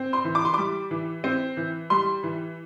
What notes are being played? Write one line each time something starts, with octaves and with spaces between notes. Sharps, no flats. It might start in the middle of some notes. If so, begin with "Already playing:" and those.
Already playing: C4
C6
E3
D6
C6
G3 D6
E3
C4
E3
G3 C6
E3